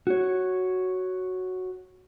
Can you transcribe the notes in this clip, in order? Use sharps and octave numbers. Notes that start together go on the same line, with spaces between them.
F#4 C#5